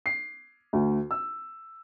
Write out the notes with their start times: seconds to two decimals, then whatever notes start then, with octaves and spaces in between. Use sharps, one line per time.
0.06 C7
0.73 D2
1.11 E6